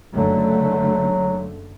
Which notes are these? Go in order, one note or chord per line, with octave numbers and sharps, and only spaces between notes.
F#1 D3 F#3 A3